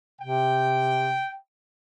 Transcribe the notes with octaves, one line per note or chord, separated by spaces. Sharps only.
C3 G5